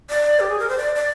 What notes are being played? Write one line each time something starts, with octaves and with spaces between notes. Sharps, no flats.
D5
G4
G#4
A#4
C5
D5
D5